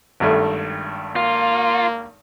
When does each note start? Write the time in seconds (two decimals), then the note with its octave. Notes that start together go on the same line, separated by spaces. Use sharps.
0.20 G#1 G2 A3
1.16 A#3 F4